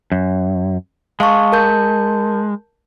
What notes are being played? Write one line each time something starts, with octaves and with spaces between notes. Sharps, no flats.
F#2
G#3 F5 A5 C#6
A#4 A5 G6